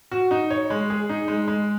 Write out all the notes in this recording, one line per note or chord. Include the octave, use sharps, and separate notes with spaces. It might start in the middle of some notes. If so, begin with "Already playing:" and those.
F#4
D#4
C#5
G#3
G#4
D#4
G#3
G#3